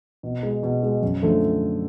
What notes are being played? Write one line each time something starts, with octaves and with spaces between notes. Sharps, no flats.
B2
G#3
B2
G#3
F#2
D3 F3 A3